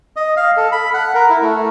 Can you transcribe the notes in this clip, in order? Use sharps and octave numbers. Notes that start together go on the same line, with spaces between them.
D#5
F5
A4
B5
F#5
A#4
E4
A3